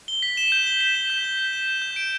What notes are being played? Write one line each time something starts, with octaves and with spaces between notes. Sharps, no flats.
G7
B6
E7
G6
G7
B6
E7
G6
G7
B6
E7
G6
G6
D7